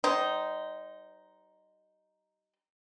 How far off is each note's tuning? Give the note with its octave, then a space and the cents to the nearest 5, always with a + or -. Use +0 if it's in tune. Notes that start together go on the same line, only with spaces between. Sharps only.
G3 -35 D#4 +0 C5 -20